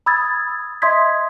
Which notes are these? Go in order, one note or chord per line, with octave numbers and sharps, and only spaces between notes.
B5 D#6 E6 G#6 A6
D#5 E5 C6 D#6 G#6 B6